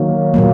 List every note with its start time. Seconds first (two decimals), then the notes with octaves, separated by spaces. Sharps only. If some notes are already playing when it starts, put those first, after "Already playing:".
Already playing: D#3 F#3 A#3
0.34 A#2 F#3 A#3